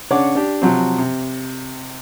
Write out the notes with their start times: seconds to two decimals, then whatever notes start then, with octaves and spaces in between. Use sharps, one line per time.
0.10 C#3 D4 C#5 F#5 D6
0.35 D4 G4
0.62 C3 F3 F#3 C4
0.98 C3